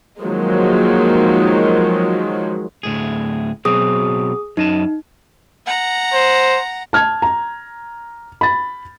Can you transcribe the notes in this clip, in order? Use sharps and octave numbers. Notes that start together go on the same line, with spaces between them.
D#3 F3 F#3 G#3 A#3
D2 A2 G#4
B2 F#3 C4 G#4 D#6
F#2 D#4 D#5 A5
F#5 A#5
C5
A5 F6 G#6
A#5
B5 A6